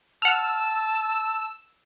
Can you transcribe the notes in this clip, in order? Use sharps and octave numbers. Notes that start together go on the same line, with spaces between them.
F#5 A5 E6 F6